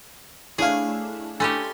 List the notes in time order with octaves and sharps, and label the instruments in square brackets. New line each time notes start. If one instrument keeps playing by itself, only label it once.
[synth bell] A3 D4 E4 [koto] G#4 [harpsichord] C#5 F5
[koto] A3 C#4 G4 [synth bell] G#5 B5 C6